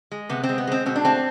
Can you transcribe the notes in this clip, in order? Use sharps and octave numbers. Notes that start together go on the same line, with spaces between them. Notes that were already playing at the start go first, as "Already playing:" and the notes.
G#3
C3 B3
C4
G#3
B3
G#3 C4
B2 C4
D4
A3 C4